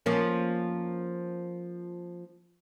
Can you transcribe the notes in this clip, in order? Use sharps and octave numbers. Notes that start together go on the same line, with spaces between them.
F3 A#3 C#4